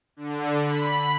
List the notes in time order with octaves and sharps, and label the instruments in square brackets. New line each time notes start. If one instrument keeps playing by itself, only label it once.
[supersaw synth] D3
B5